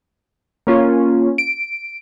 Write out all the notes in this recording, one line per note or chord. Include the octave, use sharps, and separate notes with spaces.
A#3 C#4 F4
D7